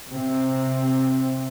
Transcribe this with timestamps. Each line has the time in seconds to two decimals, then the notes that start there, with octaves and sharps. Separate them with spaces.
0.11 C3 C4